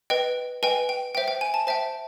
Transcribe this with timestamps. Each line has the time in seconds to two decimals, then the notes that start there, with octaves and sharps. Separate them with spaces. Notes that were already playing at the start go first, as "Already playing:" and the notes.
0.10 B4 D#5 G5
0.63 B4 D#5 G5 G#5
0.89 G5
1.15 C5 E5 G5
1.28 G5
1.41 G#5
1.54 A5
1.67 C5 E5 G5 A5